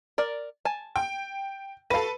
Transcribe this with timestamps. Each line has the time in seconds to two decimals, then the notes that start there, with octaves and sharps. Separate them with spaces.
0.18 A#4 D5
0.65 G#5 A5
0.96 G5
1.90 F#4 A4 B4 F5